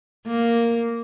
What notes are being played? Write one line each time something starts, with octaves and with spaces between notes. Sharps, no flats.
A#3